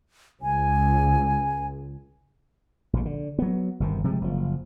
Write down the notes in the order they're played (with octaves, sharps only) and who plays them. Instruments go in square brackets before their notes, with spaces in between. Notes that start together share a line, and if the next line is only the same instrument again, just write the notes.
[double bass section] C#2 [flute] G#5
[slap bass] A#1 A#2
D3
F#3 B3
G1 C3 D#3
C3 F3 G#3
F#1 F3